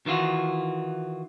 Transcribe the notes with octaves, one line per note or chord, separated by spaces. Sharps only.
D#3 E3 F4 F#4